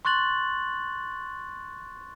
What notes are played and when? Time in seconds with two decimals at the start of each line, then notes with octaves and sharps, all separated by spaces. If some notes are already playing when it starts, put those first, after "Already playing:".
0.05 C6 C#6 F#6 A6 F#7